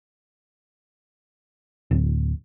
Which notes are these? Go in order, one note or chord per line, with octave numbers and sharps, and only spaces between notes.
D1